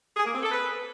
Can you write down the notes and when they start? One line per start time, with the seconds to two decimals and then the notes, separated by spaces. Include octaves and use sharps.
0.17 G#4
0.25 A#3
0.34 C4
0.42 A4
0.51 B4